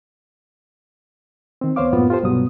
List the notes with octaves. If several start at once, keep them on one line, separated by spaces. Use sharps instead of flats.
D#3 C4
D2 B3 C5 C#5 F5 D6
F#2 A2 A#3 B3 F4
F4 G4 A4 C5
C2 G2 B2 F#3 B3 D#6